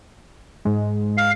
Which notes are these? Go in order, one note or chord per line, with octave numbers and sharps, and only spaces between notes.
G#2 G#3
F5